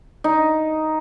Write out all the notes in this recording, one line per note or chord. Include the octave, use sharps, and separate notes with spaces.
D#4